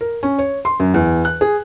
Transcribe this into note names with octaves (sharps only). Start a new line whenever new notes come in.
A#4
C#4
C#5
C6
F#2
E2
F#6
G#4